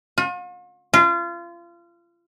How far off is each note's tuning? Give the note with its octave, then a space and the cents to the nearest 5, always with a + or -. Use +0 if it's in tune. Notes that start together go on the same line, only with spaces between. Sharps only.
F4 +45
F4 -30